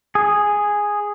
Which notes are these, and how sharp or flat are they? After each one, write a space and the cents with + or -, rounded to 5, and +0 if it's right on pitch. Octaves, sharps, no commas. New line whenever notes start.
G#4 -5